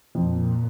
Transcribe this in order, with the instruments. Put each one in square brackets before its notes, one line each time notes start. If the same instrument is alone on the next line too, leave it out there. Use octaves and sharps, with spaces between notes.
[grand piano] F2 [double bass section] A#2